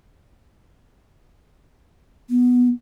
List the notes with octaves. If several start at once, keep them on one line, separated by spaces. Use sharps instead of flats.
B3